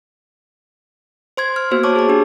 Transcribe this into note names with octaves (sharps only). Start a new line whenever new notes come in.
C5 C6 G#6
F6
A#3 B3 F#4 C5
C#5 A5 C#6 D6
G#4 D6
D4 G4